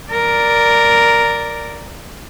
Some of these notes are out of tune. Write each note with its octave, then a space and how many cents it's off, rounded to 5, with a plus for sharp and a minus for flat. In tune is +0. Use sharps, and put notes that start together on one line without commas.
A#4 +0 D5 +0